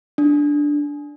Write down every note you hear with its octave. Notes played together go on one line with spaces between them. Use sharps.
D4